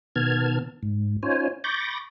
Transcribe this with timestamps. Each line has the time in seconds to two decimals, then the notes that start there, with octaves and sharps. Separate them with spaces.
0.16 B2 D#3 B3 A5 F6 G#6
0.83 G#2
1.23 C#4 D#4 F4 C5 C#5 G#5
1.64 B5 C#6 D6 G6 A6 A#6